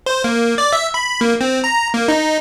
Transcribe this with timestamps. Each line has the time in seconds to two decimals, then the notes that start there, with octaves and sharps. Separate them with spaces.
0.06 C5
0.24 A#3
0.58 D5
0.73 E5
0.94 B5
1.21 A#3
1.41 C4
1.64 A#5
1.94 A#3
2.08 D#4